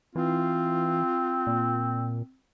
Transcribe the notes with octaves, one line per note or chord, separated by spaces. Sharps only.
E3 C4 F4
A#2